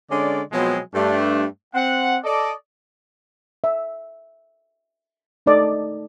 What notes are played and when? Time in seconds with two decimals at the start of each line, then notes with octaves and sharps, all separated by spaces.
0.11 D3 G#3 C#4 D5
0.53 B2 F3 F#3 G#3 B3 C4
0.95 G2 A3 D4
1.75 C4 F#5
2.25 A4 D5 D#5
3.64 E5
5.46 A3 D#4 A4 D5 D#5